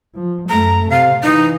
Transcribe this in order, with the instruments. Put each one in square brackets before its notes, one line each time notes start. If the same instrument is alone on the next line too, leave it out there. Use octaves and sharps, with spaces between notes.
[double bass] F3
[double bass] F#2 A3 [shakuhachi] A#5
[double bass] C3 [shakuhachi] F5
[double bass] E3 [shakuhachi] D#4